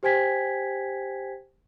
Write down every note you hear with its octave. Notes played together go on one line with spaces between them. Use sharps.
G4 C5 G5 G#5 G#6 B6